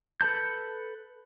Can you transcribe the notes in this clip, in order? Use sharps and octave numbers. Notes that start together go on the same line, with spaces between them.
A4 B4 A5 G6